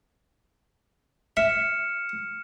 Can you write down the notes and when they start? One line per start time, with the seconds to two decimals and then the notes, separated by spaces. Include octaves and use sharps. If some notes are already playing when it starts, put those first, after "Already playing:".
1.37 E5 F6 C#7 E7